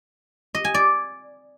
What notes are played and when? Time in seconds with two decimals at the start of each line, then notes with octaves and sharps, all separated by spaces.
0.55 D#5
0.64 G#5
0.74 D5